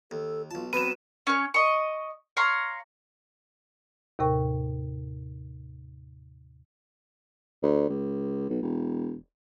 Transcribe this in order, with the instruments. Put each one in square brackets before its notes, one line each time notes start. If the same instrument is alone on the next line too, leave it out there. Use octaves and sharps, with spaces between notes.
[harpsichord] D#2 [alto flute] A4
[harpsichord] B1 A5 [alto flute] F4
[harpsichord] F#3 B3 A#4 [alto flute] C4 [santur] B4 [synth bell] D#7 E7
[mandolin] C#4 C#5
D#5 C#6
C#5 F5 A#5 C6
[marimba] D#2 A2 C3 A#4 G5 C#6
[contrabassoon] D2
C#2
B1
E1